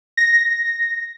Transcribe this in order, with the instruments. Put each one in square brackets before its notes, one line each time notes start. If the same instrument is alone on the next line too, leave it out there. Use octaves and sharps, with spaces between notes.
[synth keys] A#6